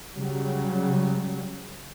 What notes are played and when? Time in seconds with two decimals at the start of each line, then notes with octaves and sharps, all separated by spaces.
0.14 C#3 F#3 G3